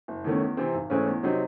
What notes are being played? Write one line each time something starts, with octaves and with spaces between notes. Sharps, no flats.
F#1
E2 D#3 A3 C#4
E2
C3 E3 C4
G#1
G#2 E3 A3 C#4
E2
C3 F#3 C4 D#4